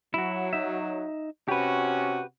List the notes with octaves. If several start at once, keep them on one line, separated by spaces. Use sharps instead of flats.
F#3 E4 F#4
D#4 E5
C3 C#4 F#4 G4 B4